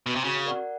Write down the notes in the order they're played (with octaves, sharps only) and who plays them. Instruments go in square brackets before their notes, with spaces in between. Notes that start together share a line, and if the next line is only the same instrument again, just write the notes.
[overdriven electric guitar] B2
C3
[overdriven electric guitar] C#3 [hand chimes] F#4
[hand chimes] A#4 D5 F#5